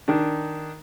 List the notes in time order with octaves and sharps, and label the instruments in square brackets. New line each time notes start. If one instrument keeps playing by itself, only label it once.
[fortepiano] D#3 D4